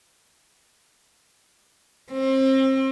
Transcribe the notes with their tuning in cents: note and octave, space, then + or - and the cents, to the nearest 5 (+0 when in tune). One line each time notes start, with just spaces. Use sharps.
C4 +30